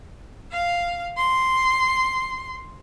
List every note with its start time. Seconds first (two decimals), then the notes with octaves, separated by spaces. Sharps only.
0.52 F5
1.17 C6